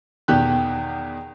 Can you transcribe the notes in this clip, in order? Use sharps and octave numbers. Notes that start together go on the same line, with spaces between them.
E2 B2 D#3 G4 F#6